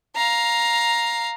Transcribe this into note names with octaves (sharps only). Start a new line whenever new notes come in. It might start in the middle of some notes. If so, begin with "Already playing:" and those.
F5 A#5